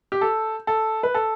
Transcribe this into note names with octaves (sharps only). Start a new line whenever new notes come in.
G4
A4
A4
B4
A4